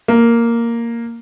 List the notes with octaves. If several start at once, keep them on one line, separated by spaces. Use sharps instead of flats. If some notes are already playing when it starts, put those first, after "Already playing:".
A#3